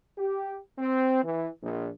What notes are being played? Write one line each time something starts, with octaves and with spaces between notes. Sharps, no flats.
G4
C4
E3
A#1